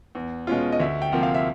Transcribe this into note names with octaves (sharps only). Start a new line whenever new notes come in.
E2
B2 G#3 C#4 F4
D#5
D2 E5
G5
C3 F3 A#3 F#5
F5
E5